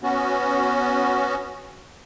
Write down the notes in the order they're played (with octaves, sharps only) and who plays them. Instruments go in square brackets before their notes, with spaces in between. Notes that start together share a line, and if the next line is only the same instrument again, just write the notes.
[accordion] B3 C#4 F#4